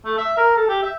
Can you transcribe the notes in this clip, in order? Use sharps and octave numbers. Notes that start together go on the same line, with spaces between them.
A3
E5
A#4
A4
G4
E5